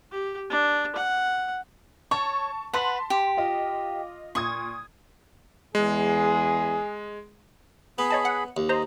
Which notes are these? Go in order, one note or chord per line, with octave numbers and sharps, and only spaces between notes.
G4
D4
F#5
C#5 A5 C#6
B4 F#5 A5 C6 B6
G4
F4 D#5
A#2 C#6 D#6 G#6
E2 G#3 G#4
B3 G#4 B5
C#5 D#5 A5
F#5
D#2
C5 D#5 A#5